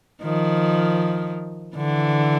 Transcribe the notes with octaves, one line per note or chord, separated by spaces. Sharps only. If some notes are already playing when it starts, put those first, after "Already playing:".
D#3 F3
D3 E3